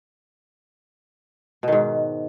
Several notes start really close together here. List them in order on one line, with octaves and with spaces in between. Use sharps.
B2 D#3 G#2